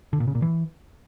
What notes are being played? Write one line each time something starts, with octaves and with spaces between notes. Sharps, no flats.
D3
A#2
C#3
A#2
E3